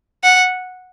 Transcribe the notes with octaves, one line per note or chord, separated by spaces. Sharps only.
F#5